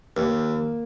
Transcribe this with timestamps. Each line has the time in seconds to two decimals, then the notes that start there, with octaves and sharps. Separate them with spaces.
0.16 D#2 A#3